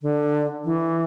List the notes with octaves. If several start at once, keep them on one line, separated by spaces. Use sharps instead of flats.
D3
E3